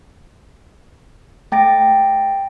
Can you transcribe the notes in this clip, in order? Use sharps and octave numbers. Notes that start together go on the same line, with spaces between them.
A3 G5 A6 A#6 D7